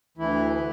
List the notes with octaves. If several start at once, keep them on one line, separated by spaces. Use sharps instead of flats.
D2 E3 E4
D3